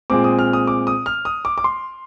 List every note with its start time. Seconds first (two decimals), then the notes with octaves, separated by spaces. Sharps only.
0.10 A#2 G#3 C4 D6
0.24 D#6
0.39 F6
0.53 D#6
0.67 D6
0.87 D#6
1.06 F6
1.25 D#6
1.45 D6
1.58 D6
1.64 C6